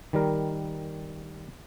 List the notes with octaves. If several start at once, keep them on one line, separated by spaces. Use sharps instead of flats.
D#3 G3 A#4